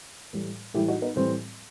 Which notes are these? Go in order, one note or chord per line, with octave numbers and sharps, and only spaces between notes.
A2 E3 G3
A2 E3 G3 E4 G4
D#4 F#4
B3 D#4
A2 E3 G3 C4